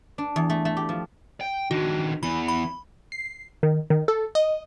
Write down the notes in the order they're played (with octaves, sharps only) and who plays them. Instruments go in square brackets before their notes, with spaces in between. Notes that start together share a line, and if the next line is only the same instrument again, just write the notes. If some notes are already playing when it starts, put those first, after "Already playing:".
[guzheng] D4
E2
A3
A3
G4
F3
[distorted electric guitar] G5
[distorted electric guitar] D#3 D4 [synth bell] F#4
[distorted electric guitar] E2 E3 [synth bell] B5
[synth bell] B5
[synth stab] C7
D#3
D#3
A4
D#5